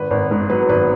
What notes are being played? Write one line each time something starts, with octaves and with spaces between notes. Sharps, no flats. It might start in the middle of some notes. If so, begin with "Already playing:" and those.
Already playing: G#1 B4
G#1
G#2
F#3 B4
G#1 B4